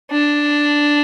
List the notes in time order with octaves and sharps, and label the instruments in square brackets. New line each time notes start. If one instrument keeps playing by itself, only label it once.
[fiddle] D4